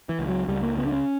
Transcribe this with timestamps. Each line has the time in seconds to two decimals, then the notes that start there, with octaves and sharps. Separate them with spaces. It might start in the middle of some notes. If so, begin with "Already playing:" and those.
0.09 E3
0.19 C#2
0.28 F#3
0.48 C#2 G3
0.63 A#3
0.77 C#3 B3
0.86 D4
0.92 C#4